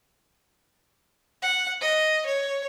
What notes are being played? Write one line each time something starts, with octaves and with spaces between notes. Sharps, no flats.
F#5
D#5
C#5